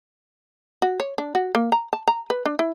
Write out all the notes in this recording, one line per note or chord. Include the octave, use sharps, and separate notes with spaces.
F#4
C#5
D4
F#4
A#3
A#5
A5
A#5
B4
D4
E4